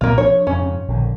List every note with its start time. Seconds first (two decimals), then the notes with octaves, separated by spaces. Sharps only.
0.01 C2 A#2 A#3 C4 F4
0.18 F3 D4 C#5
0.47 F2 G#2 C#3 C#4
0.88 A#1 D3 D#3